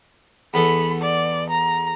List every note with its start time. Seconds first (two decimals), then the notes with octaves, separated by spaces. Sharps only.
0.54 E2 B3 A4 B5
1.01 D5
1.50 A#5